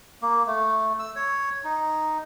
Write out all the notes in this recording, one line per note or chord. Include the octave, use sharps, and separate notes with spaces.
A#3
A3
E6
C#5
D#4